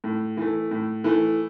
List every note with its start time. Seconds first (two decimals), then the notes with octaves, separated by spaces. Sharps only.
0.04 A2
0.37 E3 A3
0.71 A2
1.04 E3 A3